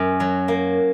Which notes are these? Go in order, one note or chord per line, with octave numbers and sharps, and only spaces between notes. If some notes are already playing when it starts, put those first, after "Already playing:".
Already playing: F#2
F#3
A#3